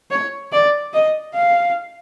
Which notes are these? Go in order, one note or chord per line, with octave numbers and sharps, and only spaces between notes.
C#5
D5
D#5
F5